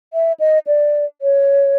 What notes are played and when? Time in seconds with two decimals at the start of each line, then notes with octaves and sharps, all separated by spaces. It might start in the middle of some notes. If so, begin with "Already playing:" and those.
0.13 E5
0.39 D#5
0.67 D5
1.21 C#5